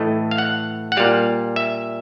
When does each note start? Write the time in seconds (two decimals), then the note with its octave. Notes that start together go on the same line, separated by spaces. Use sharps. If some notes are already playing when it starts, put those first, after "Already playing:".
Already playing: A2 E3 A3 D#5
0.31 F5
0.38 F#5
0.92 F#5
0.97 A#2 G3 F5
1.56 E5